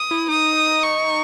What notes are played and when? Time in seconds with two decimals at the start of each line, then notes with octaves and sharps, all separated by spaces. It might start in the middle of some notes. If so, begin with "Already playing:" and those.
Already playing: D#6
0.11 E4
0.28 D#4 D#6
0.83 C#6